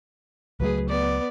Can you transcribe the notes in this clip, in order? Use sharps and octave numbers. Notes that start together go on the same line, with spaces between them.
C#2 F#3 A3 G#4 B4
B3 D5